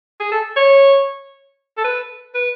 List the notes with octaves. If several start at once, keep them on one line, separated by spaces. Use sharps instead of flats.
G#4
A4
C#5
A4
B4
B4